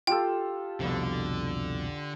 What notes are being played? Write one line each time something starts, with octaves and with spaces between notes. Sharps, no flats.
F4 G4 A4 G5
C2 F2 B2 D3